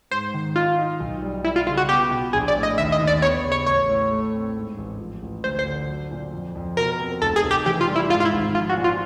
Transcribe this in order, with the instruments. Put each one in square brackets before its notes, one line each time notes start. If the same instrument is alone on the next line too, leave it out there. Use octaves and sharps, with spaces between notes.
[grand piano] G#2 [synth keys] C5
[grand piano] D#3
[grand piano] D#4 [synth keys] F4
[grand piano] D#4
B1
G3
[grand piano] G3 [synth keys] E4
[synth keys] F4
[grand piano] C#3 [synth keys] F4
[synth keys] F#4
[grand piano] B3 [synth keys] G4
[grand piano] B2
[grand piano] A#1 [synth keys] G#4
[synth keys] D5
[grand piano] A2
[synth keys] D#5
[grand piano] D#2 [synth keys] E5
[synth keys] D#5
[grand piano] D#2
[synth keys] D5
[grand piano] B3 [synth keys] C#5
[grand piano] C#3
[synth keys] C#5
[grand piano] A1 [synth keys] C#5
[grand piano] A2
A3
C4
G#2
A1
F3
A1
[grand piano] D2 [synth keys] C5
[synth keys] C5
[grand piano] D3
F#3
A#2
F2
F2
[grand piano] B2 [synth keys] A#4
[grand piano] C4
[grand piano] F1 [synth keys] A4
[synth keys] G#4
[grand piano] F1
[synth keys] G4
[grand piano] E3 [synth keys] G4
[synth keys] F4
[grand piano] G3
[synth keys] E4
[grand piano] G#2 [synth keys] F4
[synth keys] F4
E4
[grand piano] G#1
[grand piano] F3 [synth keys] F4
[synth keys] F#4
[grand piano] A#2
[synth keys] F4